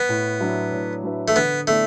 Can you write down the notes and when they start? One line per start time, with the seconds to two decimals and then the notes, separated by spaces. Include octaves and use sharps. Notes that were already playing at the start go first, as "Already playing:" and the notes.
Already playing: B3
0.09 A2
0.40 F#3 D4 B4 E5
0.72 A2
1.04 F#3 D4 B4 E5
1.28 A3
1.35 D3 B3
1.67 A3 B3 E4 D5